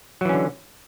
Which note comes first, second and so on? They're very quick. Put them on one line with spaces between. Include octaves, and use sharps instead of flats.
F#3 E3 C#4 D3